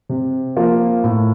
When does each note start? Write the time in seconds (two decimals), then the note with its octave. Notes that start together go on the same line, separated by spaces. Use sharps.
0.09 C3
0.57 F3 A#3 F4
1.04 A2